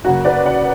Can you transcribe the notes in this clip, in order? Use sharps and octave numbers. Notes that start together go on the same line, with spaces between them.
F#2 C#3 F#3 A#3 F#4
B4 D5
D5 F#5